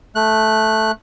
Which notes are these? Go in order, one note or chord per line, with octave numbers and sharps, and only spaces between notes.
A3 F#6